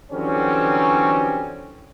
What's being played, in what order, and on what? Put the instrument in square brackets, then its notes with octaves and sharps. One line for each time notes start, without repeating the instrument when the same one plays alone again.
[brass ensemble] D3 E3 F#3 G3 C4 C#4